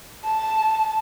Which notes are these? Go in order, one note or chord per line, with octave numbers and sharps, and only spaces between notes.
A5